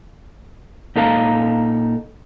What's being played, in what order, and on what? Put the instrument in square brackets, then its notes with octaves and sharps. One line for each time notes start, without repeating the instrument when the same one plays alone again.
[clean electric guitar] A#2 D#4 A4 F5 A#5